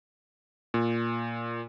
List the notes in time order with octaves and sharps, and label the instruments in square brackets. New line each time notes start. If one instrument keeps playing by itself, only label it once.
[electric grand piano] A#2